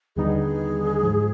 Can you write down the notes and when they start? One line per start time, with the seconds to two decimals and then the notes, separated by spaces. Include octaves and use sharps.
0.16 D#2 D3 G3 B3 D#4 G#4
1.02 G#2 F3 G#3